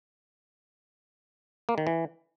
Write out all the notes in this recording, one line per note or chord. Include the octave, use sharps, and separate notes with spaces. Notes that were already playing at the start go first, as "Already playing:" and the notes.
A#3
D#3
E3